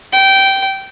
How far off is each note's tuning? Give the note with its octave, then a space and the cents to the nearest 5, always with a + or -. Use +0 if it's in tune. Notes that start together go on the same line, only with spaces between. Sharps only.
G5 -15